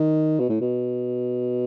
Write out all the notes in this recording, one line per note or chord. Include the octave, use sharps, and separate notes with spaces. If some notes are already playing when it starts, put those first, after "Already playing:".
Already playing: D#3
B2
A2
B2